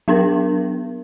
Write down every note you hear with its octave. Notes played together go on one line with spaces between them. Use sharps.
F#3 B3 D4 A#4